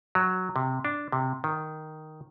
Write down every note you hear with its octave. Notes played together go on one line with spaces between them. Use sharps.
F#3
C3
D4
C3
D#3